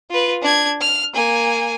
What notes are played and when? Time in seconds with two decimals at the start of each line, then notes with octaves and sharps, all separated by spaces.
0.11 F4 B4
0.42 D4 G#6
0.81 F6
1.14 A#3 G#5